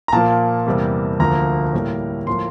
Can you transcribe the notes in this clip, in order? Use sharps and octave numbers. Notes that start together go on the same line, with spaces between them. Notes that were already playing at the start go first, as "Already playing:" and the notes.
A#5
A#2 F3 A#3 A5
E2 C3 G3 A#3
D2 D3 F3 A#3 A#5
A2 G3 A#3
A2 F3 A#3 C6